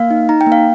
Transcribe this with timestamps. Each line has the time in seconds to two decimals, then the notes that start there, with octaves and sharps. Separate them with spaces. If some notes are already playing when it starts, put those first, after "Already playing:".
Already playing: A#3 F5
0.11 D#4
0.29 D#4 A#5
0.41 G5
0.46 A#3
0.52 F5